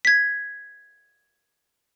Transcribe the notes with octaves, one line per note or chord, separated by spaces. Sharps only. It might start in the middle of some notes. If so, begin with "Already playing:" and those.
G#6 B6